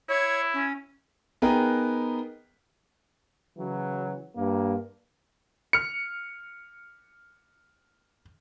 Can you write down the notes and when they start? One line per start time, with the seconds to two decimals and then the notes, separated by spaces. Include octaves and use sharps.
0.09 E4 C#5
0.54 C#4
1.42 B3 D#4 G#4 A#4 B4 G5
3.57 C#3 E3 F#3
4.36 G2 A#3
5.73 F6 C#7